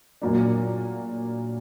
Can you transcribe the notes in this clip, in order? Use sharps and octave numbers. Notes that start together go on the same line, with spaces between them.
A#2 F#3 A#3 D4